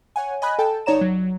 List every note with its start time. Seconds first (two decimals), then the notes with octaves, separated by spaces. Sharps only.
0.16 C#5 F#5 G#5
0.42 D#5 G#5 B5 F#6
0.59 A4 G5 A5
0.86 G1 D#4 C#5 D5 A#5 E7
1.01 F#3